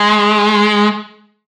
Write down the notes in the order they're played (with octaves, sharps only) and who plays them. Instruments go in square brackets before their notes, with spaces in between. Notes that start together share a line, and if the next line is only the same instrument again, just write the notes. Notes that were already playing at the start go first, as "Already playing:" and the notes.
Already playing: [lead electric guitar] G#3